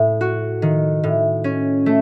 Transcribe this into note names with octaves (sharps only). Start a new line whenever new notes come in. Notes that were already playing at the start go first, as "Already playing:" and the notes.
Already playing: A2
F#4
D#3
A2
C#4
A3